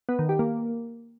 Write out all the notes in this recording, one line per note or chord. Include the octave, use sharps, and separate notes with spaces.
B3
D#3
G4
A#3